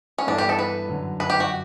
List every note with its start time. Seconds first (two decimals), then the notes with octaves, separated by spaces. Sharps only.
0.18 C#4
0.27 G2 E3 B3 D4 E4 A4
0.38 G4
0.49 A4
0.59 B4
0.88 F#2 D3 F#3
1.20 B4
1.30 G4
1.40 F#4